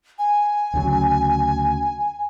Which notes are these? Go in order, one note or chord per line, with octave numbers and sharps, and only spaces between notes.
G#5
D2 C#3 F#3